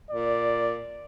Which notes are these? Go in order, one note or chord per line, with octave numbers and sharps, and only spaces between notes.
A#2 D5